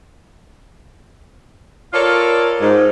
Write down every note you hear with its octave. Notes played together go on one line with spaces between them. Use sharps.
F4 A4 A#4 C#5 D5 F5
G#2